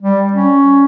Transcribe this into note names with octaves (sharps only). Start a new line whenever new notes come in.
G3
C#4